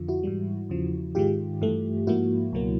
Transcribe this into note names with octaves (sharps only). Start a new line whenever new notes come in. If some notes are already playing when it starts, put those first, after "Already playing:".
Already playing: F2 D3 F3 F4
E4 F#4
G#2 E3 G3
E2 C#3 F3
G#2 D#3 G#3 F4 G4
G2 E3 A3
G#2 F3 A#3 E4 F#4
C#2 B2 F#3 A#3